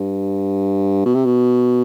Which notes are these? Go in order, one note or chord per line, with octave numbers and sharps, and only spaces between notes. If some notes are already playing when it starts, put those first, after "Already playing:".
Already playing: G2
B2
C3
B2